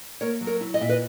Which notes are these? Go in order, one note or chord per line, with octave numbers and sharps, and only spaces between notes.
A#3 A#4 C#5
F#3
A#4 C#5
E4
D#5
A#2 E5
B4 D#5